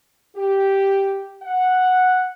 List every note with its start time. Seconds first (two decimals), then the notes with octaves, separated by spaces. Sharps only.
0.36 G4
1.43 F#5